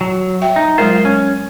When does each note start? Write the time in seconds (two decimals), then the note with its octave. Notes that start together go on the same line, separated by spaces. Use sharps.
0.01 F#3
0.42 E5 G5
0.56 D#4
0.78 F#3 G#3 F4 A#4 C5
1.05 C#4